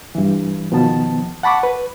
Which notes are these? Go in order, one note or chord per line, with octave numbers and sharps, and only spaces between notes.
G2 E3
D#2 B2 D#3 F3 B3 A5
F#5 A5 B5 C#6 D6
B4